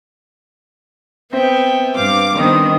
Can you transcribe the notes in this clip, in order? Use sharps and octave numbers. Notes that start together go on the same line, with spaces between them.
B3 C4 E5 G5
G2 F5 D6
D#3 G3 B3 C4 D4 D#6